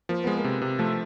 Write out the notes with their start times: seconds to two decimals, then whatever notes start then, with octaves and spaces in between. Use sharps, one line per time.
0.09 F3 A#3
0.24 G#3 B3
0.38 A#3
0.44 C3
0.62 C3
0.79 F3 A3